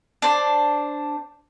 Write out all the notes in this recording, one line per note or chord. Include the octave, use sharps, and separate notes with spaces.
D4 C5